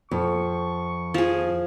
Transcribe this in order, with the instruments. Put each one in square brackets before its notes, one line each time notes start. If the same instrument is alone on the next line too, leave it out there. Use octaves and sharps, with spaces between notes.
[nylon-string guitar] F2 [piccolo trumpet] C#6
[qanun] F3 G#4